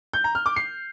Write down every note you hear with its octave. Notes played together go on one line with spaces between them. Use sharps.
G6
A#5
F6
D6
C7